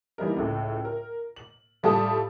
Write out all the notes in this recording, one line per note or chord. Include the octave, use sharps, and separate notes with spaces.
E3 G3 A#3 D#4 A#4
C#2 A2
A#4
F#7
A2 G3 F4 A4 A5 D#6